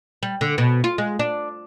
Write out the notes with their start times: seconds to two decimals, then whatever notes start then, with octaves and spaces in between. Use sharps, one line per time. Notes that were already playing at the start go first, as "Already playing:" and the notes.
0.23 G3
0.41 D3
0.58 B2
0.84 F4
0.98 G#3
1.19 D4